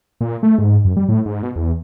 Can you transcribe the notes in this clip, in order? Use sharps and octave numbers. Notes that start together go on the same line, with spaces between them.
A#2
A3
G#2
F#2
G3
A2
G#2
B2
E2